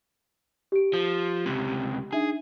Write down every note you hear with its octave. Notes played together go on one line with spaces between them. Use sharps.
G4 D7
F3
C#2 C3
D4 D#4 G#4 E5